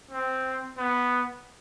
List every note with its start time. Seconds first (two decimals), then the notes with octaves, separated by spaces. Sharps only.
0.11 C4
0.78 B3